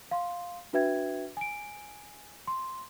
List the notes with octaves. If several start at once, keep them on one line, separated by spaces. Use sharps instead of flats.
F5 C6
D4 F#4 B4 E5 G5 G#6
G#5 D7
C6